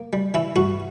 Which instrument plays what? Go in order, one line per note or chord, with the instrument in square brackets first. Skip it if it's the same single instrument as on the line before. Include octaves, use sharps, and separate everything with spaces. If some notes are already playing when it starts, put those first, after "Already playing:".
Already playing: [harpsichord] A#3
G3
E3 E4
G2 F#4